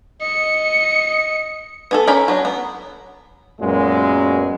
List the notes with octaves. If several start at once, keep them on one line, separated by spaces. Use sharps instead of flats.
D#5 C#7
B3 G#4 A4
C#4 A4 A#4 G5 B5
F#3 D4
B3
F#2 A#2 F#3 G#3 B3 C#4